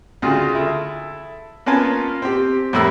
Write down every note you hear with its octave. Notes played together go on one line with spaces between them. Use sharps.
D2 C#3 F4 F#4
E4 A4
A#3 B3 C#4 F4 G#5 A5
C4 G4
F2 A2 G3 A#3 B5 E6